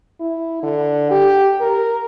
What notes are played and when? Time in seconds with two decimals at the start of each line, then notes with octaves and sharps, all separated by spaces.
0.20 E4
0.63 D3
1.11 G4
1.61 A#4